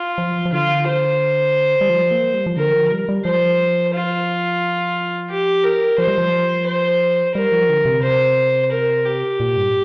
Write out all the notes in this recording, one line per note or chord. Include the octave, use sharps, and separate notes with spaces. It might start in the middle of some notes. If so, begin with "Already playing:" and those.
Already playing: F4
F3
F3
D3 F4
C5
G3
F3
A#3
G3
F3
D3 A#4
F3
G3
G3
F3 C5
F4
G4
A#4
F3 C5
G3
F3
C5
G3 A#4
F3
D3
C3
C5
A#4
G4
A#2
G2